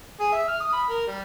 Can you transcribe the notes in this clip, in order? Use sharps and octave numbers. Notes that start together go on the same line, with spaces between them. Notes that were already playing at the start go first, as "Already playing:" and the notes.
G#4
E5
F6
D#6
B5
A#4
G3